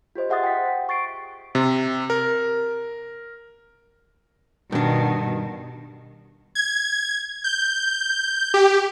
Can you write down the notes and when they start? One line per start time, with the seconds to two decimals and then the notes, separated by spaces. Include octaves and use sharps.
0.15 F4 G4 C5 D#5
0.30 G#4 E5 F#5 C6 D#6 A6
0.43 G5 B6
0.89 C#6 A6 C7 D7
1.55 C3
2.10 A#4
4.72 G2 B2 D#3 D4
6.55 G#6
7.44 G6
8.54 G4